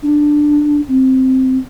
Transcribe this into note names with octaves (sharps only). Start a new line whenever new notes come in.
D4
C4